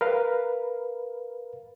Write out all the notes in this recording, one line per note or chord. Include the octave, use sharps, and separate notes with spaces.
A#4 B4 F5